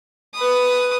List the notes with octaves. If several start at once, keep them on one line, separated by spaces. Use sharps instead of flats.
B4 D#6